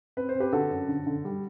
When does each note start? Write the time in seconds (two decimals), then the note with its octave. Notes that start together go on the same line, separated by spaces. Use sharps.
0.17 C4 B4
0.29 C5
0.35 C4
0.40 G4 B4
0.52 D3 F#4 A4
0.71 F#2
0.88 D3
1.07 D3
1.25 G3